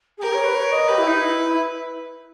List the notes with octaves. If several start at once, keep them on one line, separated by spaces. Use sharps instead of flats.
G#4
G4 A#4
C#5
B4
C#5
D#5
G4 B4
E4
D#4
E4